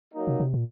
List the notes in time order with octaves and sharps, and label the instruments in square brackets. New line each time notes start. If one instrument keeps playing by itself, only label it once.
[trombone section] F#3 A#3 D#4
[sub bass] C3
C3
A#2